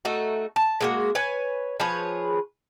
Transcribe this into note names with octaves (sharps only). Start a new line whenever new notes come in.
A3 D#4 F#4
A5
G#3 A#3 F#4
B4 C#5 G#5
F3 G#4 B4 C#5